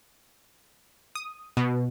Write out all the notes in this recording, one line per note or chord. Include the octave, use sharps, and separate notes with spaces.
D#6
B2